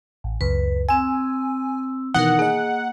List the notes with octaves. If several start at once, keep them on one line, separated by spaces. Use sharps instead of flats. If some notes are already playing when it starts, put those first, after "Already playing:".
A1
C#2 F#2 B4
C4 G#5 E6
B2 D#3 E3 D#4 A#4 F#5
A#3 G#4 D#5